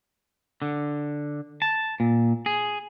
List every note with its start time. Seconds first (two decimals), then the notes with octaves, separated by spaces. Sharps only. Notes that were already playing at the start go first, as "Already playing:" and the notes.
0.62 D3
1.62 A5
2.00 A#2
2.46 G#4